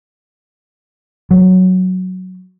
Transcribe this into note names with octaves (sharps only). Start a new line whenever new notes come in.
F#3